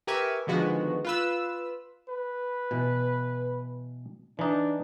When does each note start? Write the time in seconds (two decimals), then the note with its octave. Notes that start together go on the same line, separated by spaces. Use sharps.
0.07 G4 A#4 B4 E5 G#5 C#6
0.47 D3 D#3 F3 G#3 B3 F#4
1.05 F4 B4 E6
2.09 B4
2.71 B2 E3
4.39 E3 D4 D#4